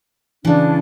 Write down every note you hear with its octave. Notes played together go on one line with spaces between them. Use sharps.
C#3 E3 D4